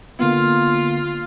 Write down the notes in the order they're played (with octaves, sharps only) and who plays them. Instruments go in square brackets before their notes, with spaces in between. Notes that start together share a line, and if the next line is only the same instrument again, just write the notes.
[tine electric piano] D3 A#3 B3 [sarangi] F4